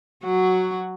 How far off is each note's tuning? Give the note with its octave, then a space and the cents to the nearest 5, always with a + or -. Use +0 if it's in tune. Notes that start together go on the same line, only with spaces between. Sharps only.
F#3 +0 F#4 +5